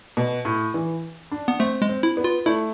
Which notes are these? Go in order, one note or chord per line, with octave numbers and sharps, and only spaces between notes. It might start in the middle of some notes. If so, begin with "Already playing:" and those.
B2
A2
E3
D4
B3
A3 C4
G#3
C4
E4
B3
F4
A3 E4